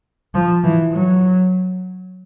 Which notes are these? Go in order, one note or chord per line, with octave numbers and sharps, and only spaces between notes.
F3
E3
F#3